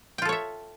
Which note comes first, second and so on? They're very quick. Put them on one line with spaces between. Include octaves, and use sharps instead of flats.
G5 F4 A4 C#5 E5